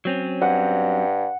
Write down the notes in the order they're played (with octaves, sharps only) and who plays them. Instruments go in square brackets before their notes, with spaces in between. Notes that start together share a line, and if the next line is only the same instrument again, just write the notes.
[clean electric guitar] F#3 C4 C#4
[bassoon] G2 [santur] F#5